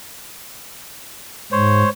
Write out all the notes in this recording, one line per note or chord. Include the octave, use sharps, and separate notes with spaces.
G#2 C5 C#5